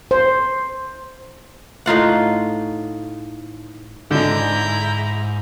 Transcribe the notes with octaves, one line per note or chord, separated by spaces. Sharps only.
C5
A2 D#4 F4 F#5
G#2 D3 D#4 E4 A#5 G6